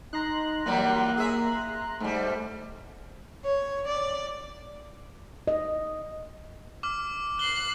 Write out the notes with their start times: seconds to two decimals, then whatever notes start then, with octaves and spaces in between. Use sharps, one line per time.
0.13 D#4 A#5 C6 F#6
0.66 E3 F#3 G3 A#3
1.17 G#4 E5
2.00 G#2 G3 A3
3.44 C#5
3.88 D5
5.47 D#5
6.83 D6 F6
7.39 F#6 C7 G7